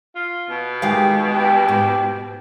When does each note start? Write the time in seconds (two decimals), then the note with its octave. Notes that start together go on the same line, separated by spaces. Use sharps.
0.15 F4
0.50 B2
0.82 D#3 G#3 G4 F5
1.33 G4
1.68 G#2